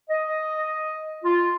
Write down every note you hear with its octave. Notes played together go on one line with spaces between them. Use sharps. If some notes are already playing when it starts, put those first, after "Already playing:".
D#5
F4